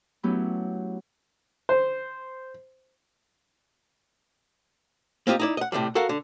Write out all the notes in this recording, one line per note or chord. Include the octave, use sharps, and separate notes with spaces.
F#3 A3 B3 C#4 E4 G4
C5
A#3 C4 F4 G4 D#5
D#4 E4 D5
D#5 F#5
A2 C3 F#3 G3
F#4 A4 A#4 F5 F#5
D3